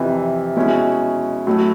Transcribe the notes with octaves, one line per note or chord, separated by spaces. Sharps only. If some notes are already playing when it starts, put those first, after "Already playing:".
Already playing: F2 C3 E3
B2 G#3 C#4 E4
A2 F#3 A3